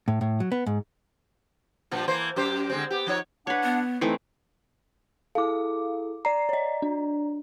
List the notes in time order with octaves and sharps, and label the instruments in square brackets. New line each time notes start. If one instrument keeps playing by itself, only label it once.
[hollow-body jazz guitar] A2
A2
F#3
B3
G#2
[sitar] G2 A#2 F3
E3 A#3 C5
F#2 G4 C5
D3 G#3 C4
B3 G4
F3 D#4 C#5
[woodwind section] D4 F#5 [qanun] B4 C#5
[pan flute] B3
[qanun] E3 A3 C4 [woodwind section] D#4
[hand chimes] E4 G#4 A4 [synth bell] F5 D6
[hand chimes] D5 A#5 [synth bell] C7
[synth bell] C#5 D#5
D4